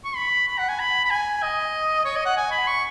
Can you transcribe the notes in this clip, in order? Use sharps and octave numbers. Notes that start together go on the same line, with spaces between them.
C#6
B5
B5
F#5
G#5
B5
B5
G#5
D#5
C#5
D#5
F#5
G#5
B5
C#6